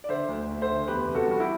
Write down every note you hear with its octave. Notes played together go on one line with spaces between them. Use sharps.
D5
D3 C5 E5
D2
D2
C5 E5
D3
E2 G4 B4
C3
F#4 A4
G3 F#4
E4 G4